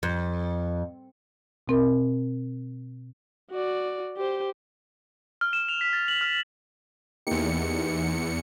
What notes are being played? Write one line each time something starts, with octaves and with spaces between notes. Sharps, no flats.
F2
B2 C4 A#4
F#4 D5
G4 C5
F6
E7
F7
B6
A6
F#7
F6
E2 A#3 D#4 G4 C#7